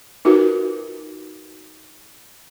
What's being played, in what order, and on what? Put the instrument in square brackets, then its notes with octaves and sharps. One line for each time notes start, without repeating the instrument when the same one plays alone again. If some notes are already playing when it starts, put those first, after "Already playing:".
[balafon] D#4 F4 F#4 A#4 B4